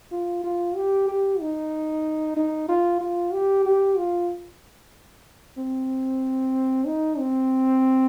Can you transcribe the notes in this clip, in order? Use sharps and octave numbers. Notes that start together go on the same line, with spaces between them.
F4
F4
G4
G4
D#4
D#4
F4
F4
G4
G4
F4
C4
D#4
C4